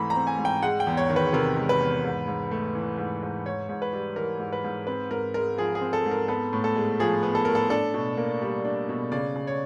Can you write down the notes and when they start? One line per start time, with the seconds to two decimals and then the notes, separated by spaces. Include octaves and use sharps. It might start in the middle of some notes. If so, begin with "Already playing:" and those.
Already playing: G#2 E3 A3 C4 A#5 B5
0.10 A#5
0.16 C4
0.27 G#5
0.38 G#2
0.45 G5
0.62 G#3 F#5
0.80 G5
0.87 E2
0.97 C#5
1.09 D#3
1.16 B4
1.33 C3 A#4
1.56 G#3
1.69 B4
1.80 E2
2.04 G#2
2.28 G#2
2.51 A3
2.75 E3
2.98 G#2
3.22 G#2
3.46 G#2 C#5
3.69 G#2
3.82 B4
3.93 G3
4.16 E3 A#4
4.40 G#2
4.53 B4
4.64 G#2
4.87 C4 B4
5.11 G#2 A#4
5.34 G#3 A#4
5.58 F3 G#4
5.75 G#4
5.81 C4
5.93 A4
6.06 G#2
6.11 A#4
6.28 B3 A4
6.53 A2
6.64 A4
6.76 G#3
7.00 F3 G#4
7.23 B3
7.35 A4
7.45 A2 A#4
7.55 A4
7.70 D4 A4
7.94 B2
8.17 A#3
8.42 G3
8.65 D4
8.89 B2
9.12 C#3 D5
9.36 C#3
9.47 C#5